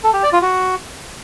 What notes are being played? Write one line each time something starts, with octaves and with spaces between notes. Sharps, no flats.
A4
G4
D5
F4
F#4